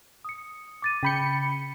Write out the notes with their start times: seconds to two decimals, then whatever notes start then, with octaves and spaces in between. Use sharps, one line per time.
0.25 D#6 C#7
0.82 D6 A6 D#7
1.03 C#3 G5 B5 G6 C#7 G7